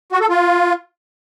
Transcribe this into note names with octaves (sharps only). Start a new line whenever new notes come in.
F#4
A4
F4